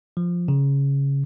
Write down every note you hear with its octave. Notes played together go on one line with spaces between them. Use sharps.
F3
C#3